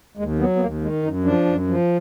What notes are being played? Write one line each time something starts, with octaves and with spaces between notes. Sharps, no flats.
D#2 G#3
F#3 B3
B3
D#2 A#3
D#3 G#3
F#2 D#4
F3 D4
F#2
F3